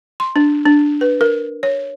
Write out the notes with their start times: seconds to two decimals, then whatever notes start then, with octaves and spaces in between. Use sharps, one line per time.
0.20 C6
0.36 D4
0.66 D4
1.01 B4
1.21 A#4
1.63 C#5